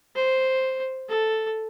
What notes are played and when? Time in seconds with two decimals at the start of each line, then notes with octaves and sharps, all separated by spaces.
0.16 C5
1.09 A4